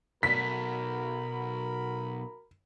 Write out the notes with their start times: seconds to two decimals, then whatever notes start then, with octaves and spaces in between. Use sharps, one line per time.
0.23 B1 B2 F#4 A#4 B5 B6